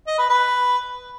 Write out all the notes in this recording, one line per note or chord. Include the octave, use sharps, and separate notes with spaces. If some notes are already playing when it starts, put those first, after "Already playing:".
D#5
B4
B4